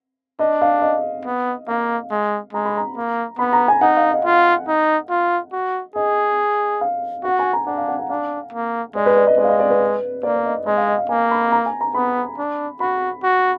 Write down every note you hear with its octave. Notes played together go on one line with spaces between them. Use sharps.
D4 D#5
F5
D#5
B3
A#3 F5
G#3
G#3 A#5
B5
A#5
A#3
B3 B5
A#5
G#5
D#4 F#5
F5
D#5
F4 D#5
D#4
F4
F#4
G#4 D#5
F5
F#4 F#5
G#5
A#5
D4 F#5
F5
F#5
F#5
D4 F5
A#3
G#3 D5
B4
D5
D#5
G#3 D5
F5
D#5
D5
B4
A#3 D5
D5
D#5
G#3 D#5
F5
D#5
F5
A#3 G#5
B5
A#5
G#5
A#5
B3 B5
D4
F#4 B5
F#4